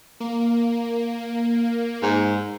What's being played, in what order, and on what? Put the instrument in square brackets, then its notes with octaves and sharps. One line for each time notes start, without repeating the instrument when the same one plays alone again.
[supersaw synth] A#3
[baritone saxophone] G#2